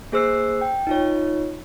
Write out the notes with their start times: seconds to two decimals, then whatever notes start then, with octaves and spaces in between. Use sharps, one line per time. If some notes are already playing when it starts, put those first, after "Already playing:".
0.12 A#3 G#4 C5 E6 F#6 C7
0.61 G5
0.87 D#4 F4 C#5